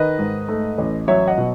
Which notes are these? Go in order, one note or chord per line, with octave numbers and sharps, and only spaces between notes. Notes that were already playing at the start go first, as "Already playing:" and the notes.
Already playing: D#3 B4 D#5
G#2
A3
A1
F#3 C#5 E5
D#5 F#5
B2